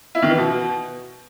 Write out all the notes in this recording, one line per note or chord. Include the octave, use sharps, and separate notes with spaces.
E4
D#3
E3
B2